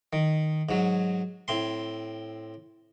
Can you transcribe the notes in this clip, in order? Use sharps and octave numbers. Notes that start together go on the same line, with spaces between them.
D#3
G#2 F#3
A2 C4 C6